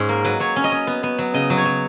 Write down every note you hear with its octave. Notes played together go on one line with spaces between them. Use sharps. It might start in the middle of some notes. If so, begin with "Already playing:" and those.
Already playing: G#2 C#4
A#3 A#4
F#3 B4
F#3 C#5
C#4
D#5
C#4
B3
B3
F#3
C#3 D#5
F#3
C#5
F#3